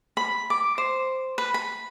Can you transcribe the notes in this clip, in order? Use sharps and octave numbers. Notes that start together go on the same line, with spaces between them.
B5
D6
C5
B4
B5